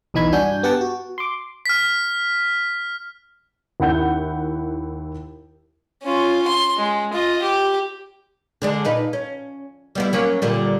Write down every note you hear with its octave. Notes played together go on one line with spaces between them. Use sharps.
B1 E2 E3 D#4 B5 G#6
G2 D4 F#4 G#5 G6
B3 G4 F#5 G5 A5
F#4
C6 D6
F6 B6
D#2 E4 F#5 G6
C#4 F4
C6
G#3
F4 D#5
G4
D3 G#3 D4
A#2 D#4 B4
C#4
G3 B3 E4
F#3 A#3 C#4
A#2 D3 G3